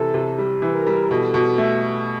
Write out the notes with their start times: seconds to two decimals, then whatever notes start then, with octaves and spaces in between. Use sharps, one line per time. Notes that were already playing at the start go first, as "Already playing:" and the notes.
Already playing: C3 E3 A4
0.14 C3
0.39 G3
0.62 E3
0.74 A#4
0.87 G3
1.10 B2 A4
1.34 B2
1.58 A3